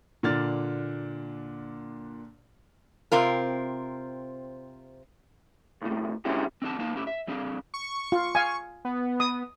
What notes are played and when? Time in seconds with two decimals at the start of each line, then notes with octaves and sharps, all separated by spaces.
0.23 A#2 D3 D4 F6 A6
3.12 C3 C4 F4 A#4
5.82 B1 F#2 A2
6.25 D3 G#3 C#4 E4 F#4 G4
6.62 C4 D4 D#4 G4 F#5 A5
6.79 A#3 B3 D#4 F5 A5
6.95 A2 C#4 E4 G4
7.07 E5
7.27 G3 C4 D4 G#4 F5
7.74 C#6
8.12 F4
8.35 F5 G#5
8.85 B3
9.20 D#6